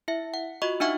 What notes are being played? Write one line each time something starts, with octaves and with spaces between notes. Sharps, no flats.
E4 E5
F#5
F4 F#4 D#5 C#6
D4 D#4 E5 F#5 C#6